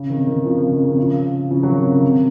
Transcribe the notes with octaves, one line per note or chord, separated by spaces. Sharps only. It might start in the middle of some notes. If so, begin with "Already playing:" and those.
Already playing: C#3
C3 D#3
C3 D#3
C#3 F3
C3 D#3
C#3
C3 D#3
C#3 F3
C#3 F3
D#3 F#3
C3 D#3
C#3
C3